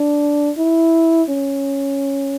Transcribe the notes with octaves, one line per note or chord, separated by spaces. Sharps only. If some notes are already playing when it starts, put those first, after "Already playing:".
Already playing: D4
E4
C#4